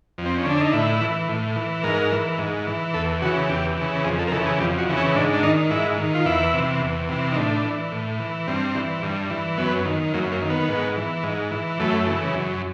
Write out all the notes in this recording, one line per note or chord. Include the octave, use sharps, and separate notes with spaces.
F2
C4
C#4
D3 D4
D#4
A2 E4
E3
A2
E3
G#2 A#4
E3
G#2
E3
E2 A4
C#3 E3 F#4
E2 G4
C#3 E3
F2 G#4
A4
A#4
C#3 E3 A4
G#4
F2 G4
F#4
C#3 E3
C#4
G#2 D4
D4
D#3 D#4
G#2 E4
D#3
F4
E2 E4
C3 E3
E2
C3 E3
D#4
A2 D4
E3
A2
E3
G2 C4
E3
G2
E3
F#2 B3
D#3
F#2 A#3
A#3
D#3
B3
G#2
E3
G#2
E3
F#2 A3
C#3 E3
F#2